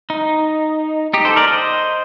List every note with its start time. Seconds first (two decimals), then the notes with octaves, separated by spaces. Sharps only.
0.10 D#4
1.14 D#4 G4
1.25 A4 C5
1.36 A#4 D5
1.48 C5 D#5